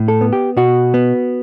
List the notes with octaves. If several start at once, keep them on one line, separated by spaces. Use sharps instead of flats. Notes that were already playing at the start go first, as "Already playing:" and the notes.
Already playing: A2
A4
B3
G4
B2 F#4
B3